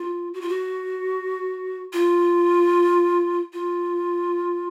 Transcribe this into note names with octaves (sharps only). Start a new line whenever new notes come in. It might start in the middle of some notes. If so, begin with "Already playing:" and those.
Already playing: F4
F#4
F4
F#4
F4
F4